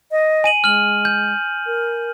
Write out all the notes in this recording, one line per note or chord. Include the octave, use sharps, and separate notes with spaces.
D#5
G#5 D#7 F#7
G#3 F6 F#7
G6
A#4